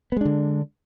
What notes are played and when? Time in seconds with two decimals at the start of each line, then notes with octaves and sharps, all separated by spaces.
0.12 B3
0.17 G#3
0.21 D4
0.25 D3